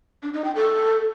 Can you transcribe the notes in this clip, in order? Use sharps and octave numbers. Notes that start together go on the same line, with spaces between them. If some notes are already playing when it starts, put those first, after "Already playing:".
D4
D#4
G5
A4